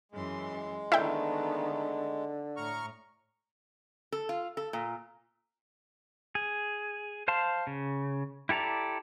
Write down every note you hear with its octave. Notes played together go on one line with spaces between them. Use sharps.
F#2 E3 G#3 C6
D3 D#3 A3 B3 E4 G5
A2 A#5 C#6 F6
A4
F4
A4
A#2
G#4
C5 F5 A5 C6
C#3
E4 G4 A4 D5 A#5